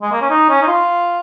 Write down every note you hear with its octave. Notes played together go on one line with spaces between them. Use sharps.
G#3
A#3
C#4
D#4
C#4
D#4
F4